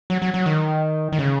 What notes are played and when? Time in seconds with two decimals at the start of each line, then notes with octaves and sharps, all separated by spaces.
0.10 F#3
0.22 F#3
0.34 F#3
0.46 D#3
1.12 D#3
1.19 C#3